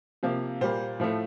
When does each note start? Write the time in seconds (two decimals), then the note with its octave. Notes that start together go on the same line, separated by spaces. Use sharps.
0.23 C3 F3 A#3
0.61 A#2 G3 A#3 C5
1.00 A2 F3 A3